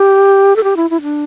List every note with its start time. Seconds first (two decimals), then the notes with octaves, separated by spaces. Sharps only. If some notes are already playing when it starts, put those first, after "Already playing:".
Already playing: G4
0.56 A4
0.64 G4
0.77 E4
0.90 E4
1.02 D4